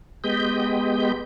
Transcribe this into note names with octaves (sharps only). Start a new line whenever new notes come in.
G#3 B3 G4 D#5 G6